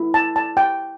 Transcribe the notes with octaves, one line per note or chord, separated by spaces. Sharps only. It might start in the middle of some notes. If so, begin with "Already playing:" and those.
Already playing: E4
A5
A5
G5